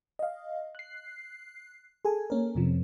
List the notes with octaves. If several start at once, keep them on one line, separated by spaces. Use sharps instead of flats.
D#5 F5
F#6 C7
G#4 A4 G#5
A#3 C#4 A#4
F2 C3 F3